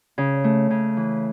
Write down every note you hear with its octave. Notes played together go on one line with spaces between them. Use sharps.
C#3
A3
C#3
E3